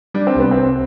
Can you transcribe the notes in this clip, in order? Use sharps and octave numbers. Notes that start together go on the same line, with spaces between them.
G3 D4
C4
C2 B3
C4
C2